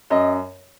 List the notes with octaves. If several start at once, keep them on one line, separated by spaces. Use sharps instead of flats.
F#2 D#5